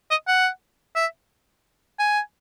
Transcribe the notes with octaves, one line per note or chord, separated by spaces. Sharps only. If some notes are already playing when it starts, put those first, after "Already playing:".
D#5
F#5
E5
G#5